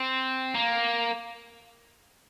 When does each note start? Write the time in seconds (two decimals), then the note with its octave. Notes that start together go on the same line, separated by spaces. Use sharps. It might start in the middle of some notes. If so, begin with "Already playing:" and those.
Already playing: C4
0.55 A#3